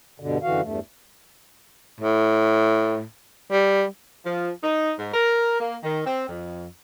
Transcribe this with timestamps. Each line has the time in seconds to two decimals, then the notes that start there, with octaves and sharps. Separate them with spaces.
0.20 G2 B2 D3
0.43 F#2 D3 E3 F#4 F5
0.61 E2 G2 A3
2.00 A2
3.51 G3
4.26 F3
4.62 D#4
4.98 G#2
5.14 A#4
5.60 A#3
5.83 D#3
6.05 C4
6.29 F2